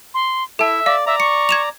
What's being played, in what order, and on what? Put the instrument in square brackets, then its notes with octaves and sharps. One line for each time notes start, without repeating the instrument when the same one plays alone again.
[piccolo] C6
[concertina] E4 [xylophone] A4 A5 [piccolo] E5
[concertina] D5 [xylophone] F5
[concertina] D5 A#5 [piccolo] E5
[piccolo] C#6 [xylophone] C#7
[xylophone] G#6 E7 F7